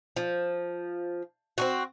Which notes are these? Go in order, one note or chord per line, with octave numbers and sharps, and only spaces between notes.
F3
C4 D#4 F#4